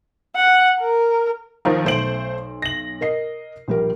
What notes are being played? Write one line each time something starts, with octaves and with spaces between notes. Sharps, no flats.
F#5
A#4
D#2 D#3 F3 F5 A#5
B1 A3 C5 C6 D7 F#7
A#6 F#7
A#4 D#5 C7
A#1 G3 A#4